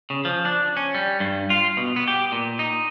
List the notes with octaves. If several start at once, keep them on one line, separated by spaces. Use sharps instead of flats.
C#3
F3
D4
C#4
G3
G2
F4
B2
B3
G4
A#2
D#4